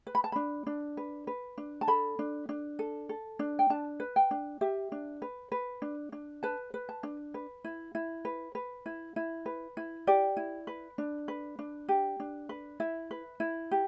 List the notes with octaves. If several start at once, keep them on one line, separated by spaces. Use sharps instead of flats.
B4
B5
A5
D4 B5
D4
B4
B4
D4
A5
A4 B5
D4
D4
A4
A4
D4
G5
D4 A5
B4
G5
D4
G4 E5
D4
B4
B4
D4
D4
B4 A5
B4
A5
D4
B4
E4
E4
B4
B4
E4
E4
B4
E4
G4 D5
E4
B4
D4
B4
D4
G4
D4
B4
E4 E5
B4
E4
G4